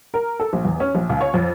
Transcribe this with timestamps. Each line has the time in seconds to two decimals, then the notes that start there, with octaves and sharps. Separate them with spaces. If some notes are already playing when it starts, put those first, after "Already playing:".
0.14 A#4
0.40 A4
0.53 A#1
0.65 E2
0.80 C#4
0.95 A#1
1.09 C#2
1.21 C#5
1.34 F2